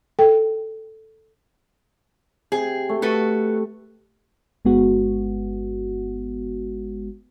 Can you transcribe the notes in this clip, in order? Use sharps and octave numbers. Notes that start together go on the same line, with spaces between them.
A4 G5
C3 G#4
A3
F#4 A4 B4
G1 G#3 B3 F#4